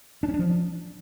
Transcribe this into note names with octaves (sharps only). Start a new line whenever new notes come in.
D4
C#4
D4
F3